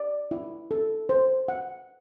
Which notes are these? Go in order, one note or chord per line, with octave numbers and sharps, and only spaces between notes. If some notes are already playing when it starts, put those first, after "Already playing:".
Already playing: D5
E4
A4
C5
F#5